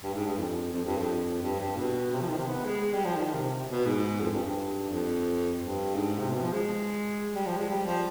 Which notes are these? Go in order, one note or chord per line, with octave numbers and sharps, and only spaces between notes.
G2
G#2
G2
F2
F2
G2
F2
G2
G2
B2
C3
F3
D#3
C3
B3
G#3
G#3
G3
F3
D#3
C3
B2
G#2
F2
G2
G2
F2
G2
G#2
C3
B2
F3
G#3
G3
F3
G#3
G3
F3